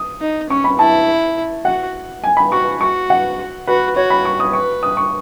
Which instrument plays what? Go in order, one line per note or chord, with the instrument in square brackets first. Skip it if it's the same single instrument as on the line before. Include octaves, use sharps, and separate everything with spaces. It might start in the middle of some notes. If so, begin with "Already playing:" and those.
Already playing: [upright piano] D#6
[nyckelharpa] D#4
[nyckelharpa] C#4 [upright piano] C#6
[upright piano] B5
[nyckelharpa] E4 [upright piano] A5
[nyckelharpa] F#4 [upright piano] F#5
[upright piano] G#5
B5
[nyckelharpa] F#4 [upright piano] C#6
[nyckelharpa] F#4 [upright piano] C#6
[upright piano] F#5
[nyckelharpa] F#4 [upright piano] B4
[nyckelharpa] F#4 [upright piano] C#5
[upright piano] B5
C#6
D#6
[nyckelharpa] B4 [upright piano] C#6
[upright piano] D#6
C#6